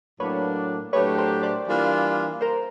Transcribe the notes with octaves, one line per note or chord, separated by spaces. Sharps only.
A2 F#3 A#3 D4 B4 C#5
A2 F#3 A3 D4 G4 B4 C#5
A#4 C5
C5 D5
E3 G3 A#3 D4 F4
A#4 C5